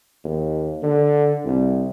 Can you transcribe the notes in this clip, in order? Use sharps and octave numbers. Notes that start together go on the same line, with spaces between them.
D#2
D3
C2